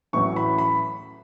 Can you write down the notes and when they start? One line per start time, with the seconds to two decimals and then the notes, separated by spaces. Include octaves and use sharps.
0.13 A1 A2 F#3 C#4 C#6
0.36 B5
0.58 B5